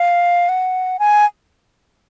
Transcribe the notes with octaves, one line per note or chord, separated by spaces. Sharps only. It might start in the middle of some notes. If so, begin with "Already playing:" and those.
Already playing: F5
F#5
G#5